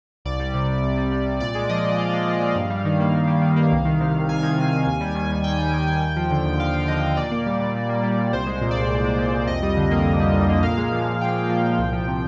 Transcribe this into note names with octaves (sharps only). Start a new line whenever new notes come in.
C2 D5
G3
C3
C2
C2
G3
C3
C2
A#2 D5
G#3
F3 D#5
A#2
A#2 F5
G#3
F3
A#2
G2
G3
D#3
A#3
G2
G3
D#3
A#3
C2
D#3
C3
C2
C2 G#5
D#3
C3
C2
D#2
G3
D#3
D#2
D#2 G5
G3
D#3
D#2
D#2
F3
D3
D#2
D#2 F5
F3
D3 D#5
D#2
A#2 D5
A#3
G3
A#2
A#2
A#3
G3
A#2
C2 C5
G#3
A#2
D5
C2
C2
G#3
A#2
C2
F2 D#5
G3
D3
A#3
F2
G3
D3
A#3
A#2 F5
G#3
F3
A#2
A#2 G5
G#3
F3
A#2
C2
F3
C3